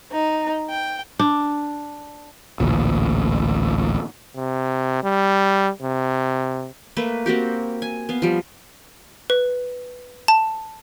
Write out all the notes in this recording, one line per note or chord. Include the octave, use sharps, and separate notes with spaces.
D#4
G5
D4
A1 D2 A#2
C3
G3
C3
A3 A#3 B4
A#3 C4 F#4 G4
G#5
B3 F5
F3 G3
B4
A5